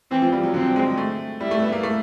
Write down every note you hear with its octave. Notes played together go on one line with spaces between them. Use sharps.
E3 C4
F3
G3
F#3
D3 C4
G#3
A3
G3 E4
A3
B3
A#3
A3